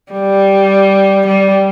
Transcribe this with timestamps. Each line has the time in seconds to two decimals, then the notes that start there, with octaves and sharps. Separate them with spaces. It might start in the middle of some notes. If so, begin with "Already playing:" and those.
0.12 G3
1.27 G3